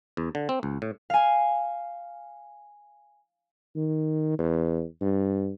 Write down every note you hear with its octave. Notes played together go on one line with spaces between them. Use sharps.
E2
D3
C4
C#2
A2
F5 G#5
D#3
E2
G2